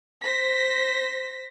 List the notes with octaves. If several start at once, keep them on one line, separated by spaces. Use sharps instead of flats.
C5 A#6 B6